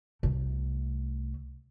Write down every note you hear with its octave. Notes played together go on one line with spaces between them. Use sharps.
C2 A3